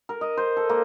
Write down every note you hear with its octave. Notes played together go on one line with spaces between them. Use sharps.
A#4
D#5
C5
A4
A#3